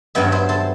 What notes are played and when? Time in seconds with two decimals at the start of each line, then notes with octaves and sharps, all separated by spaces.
0.15 G2 F#3 B3 E5 G5
0.32 C5 E5
0.49 A4 C5